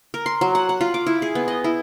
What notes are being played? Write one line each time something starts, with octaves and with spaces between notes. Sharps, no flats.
A#4
C6
F#3
F#5
F#5
F4
D6
E4
G#4
B3
D#5
E4